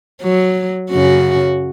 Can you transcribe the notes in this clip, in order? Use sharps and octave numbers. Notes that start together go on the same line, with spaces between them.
F#3
F#2 C#3 F#4